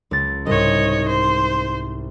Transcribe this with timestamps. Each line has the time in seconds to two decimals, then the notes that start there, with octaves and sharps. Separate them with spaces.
0.11 C#2 A6
0.46 C2 G#2 C#5 D#5
1.09 C5